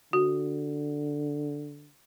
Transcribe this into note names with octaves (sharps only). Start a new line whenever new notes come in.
D3 F#4